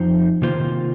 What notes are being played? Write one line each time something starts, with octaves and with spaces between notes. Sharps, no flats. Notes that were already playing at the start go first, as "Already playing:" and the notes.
Already playing: F2 F3 D#4 C5
C3 D#3 A#3 F4 C5